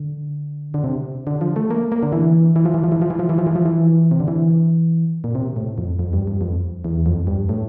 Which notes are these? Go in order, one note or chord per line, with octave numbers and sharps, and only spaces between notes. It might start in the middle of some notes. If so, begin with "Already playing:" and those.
Already playing: D3
D3
C3
D3
F3
A3
A#3
A#3
D3
E3
E3
F3
E3
F3
E3
F3
E3
F3
E3
F3
E3
F3
E3
C3
D3
E3
A#2
C3
A2
F2
F2
G2
G2
F2
E2
F2
G2
A2